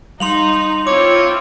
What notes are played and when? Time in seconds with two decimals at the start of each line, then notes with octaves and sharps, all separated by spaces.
0.20 G3 D#4 C6 F7 F#7
0.87 C4 E4 F4 C#5 D6